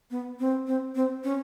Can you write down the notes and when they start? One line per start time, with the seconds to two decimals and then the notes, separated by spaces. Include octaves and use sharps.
0.11 B3
0.39 C4
0.67 C4
0.95 C4
1.24 C#4